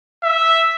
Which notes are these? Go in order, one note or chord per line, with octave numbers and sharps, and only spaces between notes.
E5